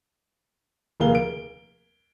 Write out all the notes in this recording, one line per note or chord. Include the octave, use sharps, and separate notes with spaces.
F1 D#2 A#3 G#4 F5 G7
D7